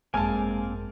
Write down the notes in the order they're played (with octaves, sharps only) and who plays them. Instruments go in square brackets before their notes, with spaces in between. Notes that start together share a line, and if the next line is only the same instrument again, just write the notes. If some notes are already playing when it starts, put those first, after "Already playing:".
[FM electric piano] G#1 F#2 [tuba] G#3 [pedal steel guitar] A#3 C4 F5 [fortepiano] G#5 A5